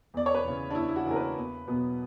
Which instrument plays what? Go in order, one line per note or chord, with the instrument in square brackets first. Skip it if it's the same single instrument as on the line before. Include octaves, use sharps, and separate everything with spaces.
[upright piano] E2 D5
C#5
B4
C#3 E3
D4
E2 E4
E4
F#4
C#3 E3 A#4
B4
E2
B2 F#3 B3